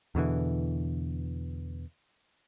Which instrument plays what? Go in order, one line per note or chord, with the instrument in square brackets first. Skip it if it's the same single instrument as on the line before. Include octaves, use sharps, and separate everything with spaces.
[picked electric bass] E2 B2 D3 E3